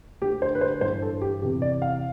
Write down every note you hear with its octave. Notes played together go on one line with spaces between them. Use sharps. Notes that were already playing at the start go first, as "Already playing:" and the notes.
D2 D3 G4
C5
B4
C5
G2 E3 C5
A4
G4
E2 C3 E3 G4
D5
F5